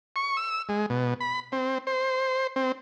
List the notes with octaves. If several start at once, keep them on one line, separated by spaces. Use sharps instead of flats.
C#6
E6
G#3
B2
B5
C4
C5
C4